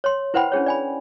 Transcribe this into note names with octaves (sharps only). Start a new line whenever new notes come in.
C#5 C6
E4 B4 C5 F#5 G5 B5
C#4 D4 G#4 C#5
D5 G#5 B5